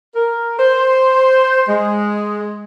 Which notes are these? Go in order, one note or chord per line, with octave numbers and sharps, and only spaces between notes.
A#4
C5
G#3